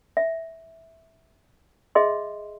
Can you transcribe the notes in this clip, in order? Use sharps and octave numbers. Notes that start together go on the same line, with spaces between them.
E5
G#4 D#5 E5 C6